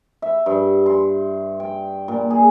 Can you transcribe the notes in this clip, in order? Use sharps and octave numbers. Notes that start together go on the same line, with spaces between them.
E5
G2
C6
G5
A#2
G#4